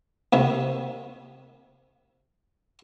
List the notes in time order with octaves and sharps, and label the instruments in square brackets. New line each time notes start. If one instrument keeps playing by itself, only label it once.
[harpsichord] D#2 C3 D#3